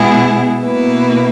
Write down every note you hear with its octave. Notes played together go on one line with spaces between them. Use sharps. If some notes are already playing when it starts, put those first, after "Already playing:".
Already playing: B2 G#3 B3 E4 G#4
B2 A#3 E4 B4